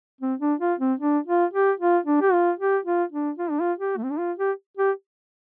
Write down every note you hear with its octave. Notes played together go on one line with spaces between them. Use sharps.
C4
D4
F4
C4
D4
F4
G4
F4
D4
G4
F4
G4
F4
D4
F4
D4
F4
G4
A3
C4
D4
F4
G4
G4